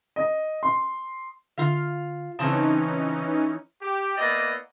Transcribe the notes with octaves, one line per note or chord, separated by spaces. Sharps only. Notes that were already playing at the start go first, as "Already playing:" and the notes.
D#5
C6
D3 F4 F5
C#3 E3 C4 C#4 D#4 A5
G4
A#3 B3 E4 D5 D#5